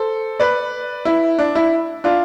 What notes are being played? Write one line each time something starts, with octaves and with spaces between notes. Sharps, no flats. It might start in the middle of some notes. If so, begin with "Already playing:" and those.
Already playing: A4 C5
B4 D5
E4
D4
E4
D4 F4